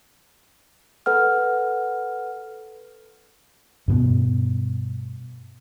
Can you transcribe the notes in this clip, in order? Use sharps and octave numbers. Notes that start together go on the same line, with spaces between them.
A4 B4 F#5 F6
G2 B2 B3